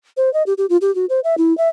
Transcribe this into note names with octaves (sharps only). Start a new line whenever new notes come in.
C5
D#5
G4
G4
F4
G4
F#4
C5
E5
E4
E5